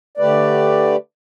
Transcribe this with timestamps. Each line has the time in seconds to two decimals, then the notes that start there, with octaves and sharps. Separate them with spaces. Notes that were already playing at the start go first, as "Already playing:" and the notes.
0.17 D3 A3 G4 B4 D5